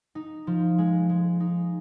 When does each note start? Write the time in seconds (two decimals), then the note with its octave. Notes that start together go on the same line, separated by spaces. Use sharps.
0.15 D#4
0.47 F3
0.78 G#3
1.09 G#3
1.40 D#4